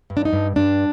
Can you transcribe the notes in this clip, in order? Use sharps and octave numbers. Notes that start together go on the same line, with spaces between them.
G2
D4
D#4
G2
G2 D4